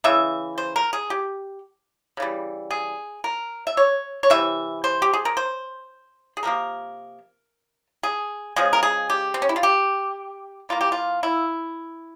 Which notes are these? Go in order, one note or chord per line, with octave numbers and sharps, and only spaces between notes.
C#3 E3 E5
C5
A#4
G#4
G4
C#3 E3 G3
G#4
A#4
E5
C#5
C#5
C3 E3 E5
C5
G4
G#4
A#4
C5
G#4
C3 F3 A#3 A#4
G#4
C#3 F3 G#3 G#4
A#4
G#4
G4
C4
C#4
E4
F4
G4
E3 A#3 F4
G4
F4
E4